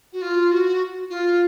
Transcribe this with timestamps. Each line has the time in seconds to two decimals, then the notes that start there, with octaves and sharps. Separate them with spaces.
0.12 F#4
0.21 F4
0.51 F#4
1.10 F4